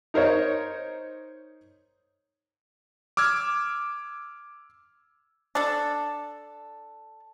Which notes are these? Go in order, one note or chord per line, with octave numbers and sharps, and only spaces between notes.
D#4 A#4 C5 C#5
D6 E6 F6 G#6
D4 A4